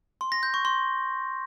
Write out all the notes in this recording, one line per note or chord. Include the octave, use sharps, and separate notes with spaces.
C6
A#6
G6
C#6
C6